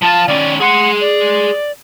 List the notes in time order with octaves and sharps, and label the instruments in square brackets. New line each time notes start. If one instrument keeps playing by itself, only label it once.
[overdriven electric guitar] F3 F4 [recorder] A5
[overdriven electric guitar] D#3 C#4 [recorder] D5
[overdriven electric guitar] G#4 C6 [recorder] F#5
[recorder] D5